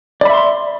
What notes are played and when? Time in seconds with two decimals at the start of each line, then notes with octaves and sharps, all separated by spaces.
0.21 D5
0.25 B5
0.29 E5
0.34 C6